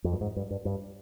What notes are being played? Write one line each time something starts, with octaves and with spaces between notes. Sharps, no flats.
F2
G2
G#2
G2
G2
G2